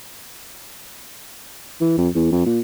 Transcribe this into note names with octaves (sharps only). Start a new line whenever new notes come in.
E3
F2
E2
F2
A#2